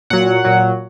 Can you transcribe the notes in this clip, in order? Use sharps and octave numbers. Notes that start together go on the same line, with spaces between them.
A#2 F#3 F#5
A#2 F#3